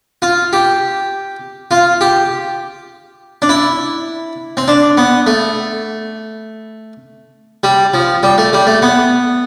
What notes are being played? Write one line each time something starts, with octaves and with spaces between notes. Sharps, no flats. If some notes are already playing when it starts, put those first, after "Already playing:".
F4
G4
F4
G4
D4
E4
C4
D4
B3
A3
G3
F3
G3
A3
G3
A3
B3